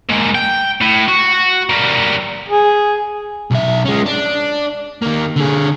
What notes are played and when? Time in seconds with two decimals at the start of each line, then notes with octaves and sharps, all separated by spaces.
0.10 G#3 A#3
0.35 G5
0.81 A2
1.08 F#4
1.70 G3 A#3
2.49 G#4
3.51 B1 E5
3.85 G#3 C#4
4.06 D4
5.02 D#3 A#3
5.36 D3 G#4